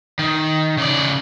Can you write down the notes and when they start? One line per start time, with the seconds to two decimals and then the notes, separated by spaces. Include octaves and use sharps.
0.19 D#3
0.78 C#3 D5